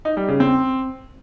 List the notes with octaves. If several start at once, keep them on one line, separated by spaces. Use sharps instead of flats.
D#4
G3
C#3
C4